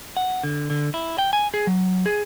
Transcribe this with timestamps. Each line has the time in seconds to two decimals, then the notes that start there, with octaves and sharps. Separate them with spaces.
0.17 F#5
0.44 D3
0.70 D3
0.94 E4
1.18 G5
1.33 G#5
1.54 G#4
1.67 F#3
2.06 G#4